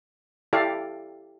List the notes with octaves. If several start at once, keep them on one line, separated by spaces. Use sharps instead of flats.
E4 G4 A4 D5 F5